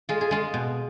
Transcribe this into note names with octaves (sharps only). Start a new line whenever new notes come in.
G#3 F4
G#4
G#3 F4
B2